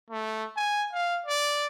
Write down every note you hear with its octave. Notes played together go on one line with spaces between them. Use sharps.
A3
G#5
F5
D5